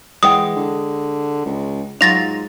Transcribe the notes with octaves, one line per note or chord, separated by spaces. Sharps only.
E3 G#3 F#5 G5 D#6
D3
C#2
G#2 F#3 F4 F5 A6 A#6 F7